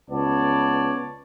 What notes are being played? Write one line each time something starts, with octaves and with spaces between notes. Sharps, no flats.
C#2 B3 C#5 D5 A5